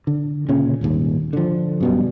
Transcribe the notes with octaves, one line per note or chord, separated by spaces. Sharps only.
D3
A#2 C#3 C#4
D#1 G#1 D#2
D3 F3
F#2 B2 G3